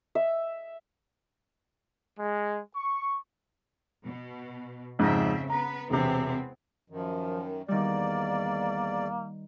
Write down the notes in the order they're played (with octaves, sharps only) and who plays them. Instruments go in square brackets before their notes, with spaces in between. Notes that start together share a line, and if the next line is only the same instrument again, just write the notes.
[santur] E5
[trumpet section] G#3
C#6
[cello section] B2
[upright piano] F2 G#2 [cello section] C#3 C4 E5
[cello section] B3 B4 [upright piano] A#5
[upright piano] E1 C3 [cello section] E3 B3 C4
[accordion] F#2 D#3 [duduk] F3
[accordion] E2 D5 [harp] D#3 G3 [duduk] A#3